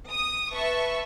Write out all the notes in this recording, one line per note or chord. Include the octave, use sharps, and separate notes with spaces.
D#6
B4 E5 A5 C#6